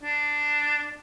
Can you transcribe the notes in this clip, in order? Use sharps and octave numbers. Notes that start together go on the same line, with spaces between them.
D4